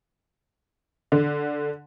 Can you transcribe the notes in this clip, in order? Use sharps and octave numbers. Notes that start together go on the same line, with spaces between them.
D3